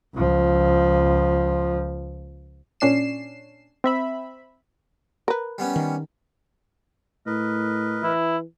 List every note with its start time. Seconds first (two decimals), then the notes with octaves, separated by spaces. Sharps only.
0.14 C#2 F3
2.80 A#2 C#4 D4 C7 E7
3.84 C4 E5 B5
5.28 A#4 B4
5.58 G3 B3 C#4
5.76 D#3
7.26 A2 A#4 B4 D#5
8.03 E3 E4